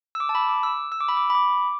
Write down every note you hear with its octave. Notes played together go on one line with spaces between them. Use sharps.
E6
D6
A5
B5
D6
E6
E6
D6
B5
D6
B5
D6